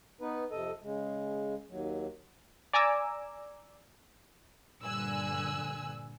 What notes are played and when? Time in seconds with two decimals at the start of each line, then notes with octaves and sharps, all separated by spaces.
0.21 B3 D#4 B4
0.51 F2 C3 A4 D#5
0.83 C#3 G#3
1.69 D#2 F#3
2.73 D5 G#5 A#5 D6 E6
4.83 A#1 G2 D3 G#5 E6 F#6